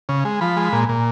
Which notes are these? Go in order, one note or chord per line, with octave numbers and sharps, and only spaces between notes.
C#3
G#3
F3 B5
G#3
A#2
A#2